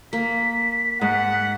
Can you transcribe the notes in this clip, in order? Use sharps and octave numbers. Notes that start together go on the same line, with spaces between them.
A#3 B6
G#2 F#5